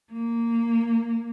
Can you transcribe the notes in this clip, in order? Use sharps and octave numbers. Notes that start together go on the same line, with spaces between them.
A#3